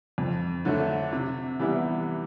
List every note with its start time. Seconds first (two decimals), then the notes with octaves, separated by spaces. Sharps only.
0.18 F2
0.65 D3 F#3 A3
1.13 C3
1.60 E3 G3 B3 E4